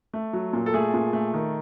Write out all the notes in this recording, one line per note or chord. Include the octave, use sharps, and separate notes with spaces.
A3
F#3
A#2
A4
A3 G#4
A#2
A3
D#3